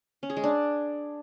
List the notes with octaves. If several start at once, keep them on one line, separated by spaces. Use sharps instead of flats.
C#4
G#4
G#3
D4